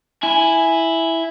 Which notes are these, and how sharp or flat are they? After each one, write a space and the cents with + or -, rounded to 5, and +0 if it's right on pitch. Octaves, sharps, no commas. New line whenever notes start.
E4 +0 G#5 +0